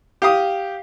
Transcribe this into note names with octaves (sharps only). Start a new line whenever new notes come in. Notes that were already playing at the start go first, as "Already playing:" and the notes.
G4 F5 D#6